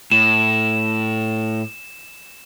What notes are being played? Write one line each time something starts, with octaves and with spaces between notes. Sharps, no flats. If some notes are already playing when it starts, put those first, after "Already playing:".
A2 E7